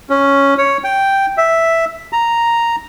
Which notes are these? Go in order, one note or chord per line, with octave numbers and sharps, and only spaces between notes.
C#4
C#5
G5
E5
A#5